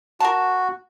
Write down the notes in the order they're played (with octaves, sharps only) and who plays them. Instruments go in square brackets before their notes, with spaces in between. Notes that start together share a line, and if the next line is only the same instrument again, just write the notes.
[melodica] F#4 [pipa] A#4 A5